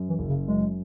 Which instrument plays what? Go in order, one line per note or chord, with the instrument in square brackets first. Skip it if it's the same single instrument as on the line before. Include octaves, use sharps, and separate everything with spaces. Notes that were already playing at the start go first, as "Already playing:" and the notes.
Already playing: [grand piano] F#2
[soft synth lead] E3
[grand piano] F#1
[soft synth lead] C#3
[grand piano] F#2 [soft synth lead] G#3